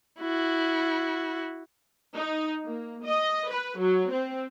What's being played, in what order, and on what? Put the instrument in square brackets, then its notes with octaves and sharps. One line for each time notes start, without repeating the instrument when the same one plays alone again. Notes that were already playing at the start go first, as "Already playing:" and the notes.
[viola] E4 F#4
[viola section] D#4
A#3
D#5
B4
F#3
C4